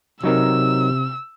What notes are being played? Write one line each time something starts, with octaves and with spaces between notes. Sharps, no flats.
C3 F#3 D#4 A#4 E6